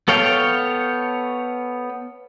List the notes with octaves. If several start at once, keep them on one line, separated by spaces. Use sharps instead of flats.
B3 A4 C#5 F5 G5